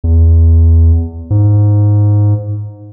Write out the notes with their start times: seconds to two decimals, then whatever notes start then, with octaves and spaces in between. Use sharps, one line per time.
0.04 E2
1.30 G#2